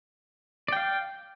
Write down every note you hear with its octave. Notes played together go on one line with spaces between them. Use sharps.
D5 F5 G5